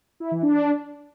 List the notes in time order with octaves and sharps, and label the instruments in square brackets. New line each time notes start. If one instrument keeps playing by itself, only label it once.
[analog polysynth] E4
E3
D4